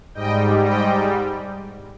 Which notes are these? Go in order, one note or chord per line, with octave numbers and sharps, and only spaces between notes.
G#2 G3 D#5 G5
D#5 G5